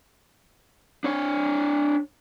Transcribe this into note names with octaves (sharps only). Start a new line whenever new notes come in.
D4 C#5